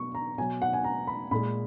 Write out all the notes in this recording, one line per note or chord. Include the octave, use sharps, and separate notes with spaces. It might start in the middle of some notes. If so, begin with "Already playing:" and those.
Already playing: B2 F#3 C#6
A#5
B2 F#3 G#5
F#5
G#5
A#5
B5
A#2 G#3 B5